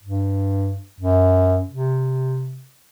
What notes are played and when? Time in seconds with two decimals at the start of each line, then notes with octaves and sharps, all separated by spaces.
0.03 G2
1.01 F#2
1.70 C3